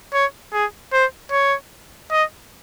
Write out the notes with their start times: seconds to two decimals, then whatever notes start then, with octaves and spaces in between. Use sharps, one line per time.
0.14 C#5
0.53 G#4
0.93 C5
1.32 C#5
2.11 D#5